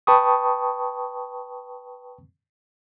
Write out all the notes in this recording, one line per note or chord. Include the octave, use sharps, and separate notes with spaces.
B4 G5 A5 B5 C#6 D#6